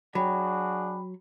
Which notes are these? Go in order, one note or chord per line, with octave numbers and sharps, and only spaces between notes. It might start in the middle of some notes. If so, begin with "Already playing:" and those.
F#3 D4 F#4 G#4 G5 B5